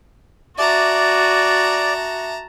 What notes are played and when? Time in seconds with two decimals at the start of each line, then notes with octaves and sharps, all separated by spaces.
0.58 F#4 D5 E5 A5 A#5 D6